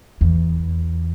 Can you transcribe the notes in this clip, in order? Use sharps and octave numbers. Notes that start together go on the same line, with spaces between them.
E2